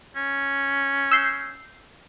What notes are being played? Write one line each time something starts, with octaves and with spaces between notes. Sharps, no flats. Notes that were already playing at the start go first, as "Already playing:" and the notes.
C#4
E6 G6 C7